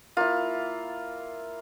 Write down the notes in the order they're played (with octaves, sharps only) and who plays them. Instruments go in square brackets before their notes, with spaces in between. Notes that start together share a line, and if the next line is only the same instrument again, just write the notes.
[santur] A#3 E4 F4